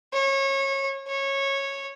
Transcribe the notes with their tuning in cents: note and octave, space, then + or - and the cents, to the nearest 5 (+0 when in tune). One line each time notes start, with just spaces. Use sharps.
C#5 -25
C#5 -15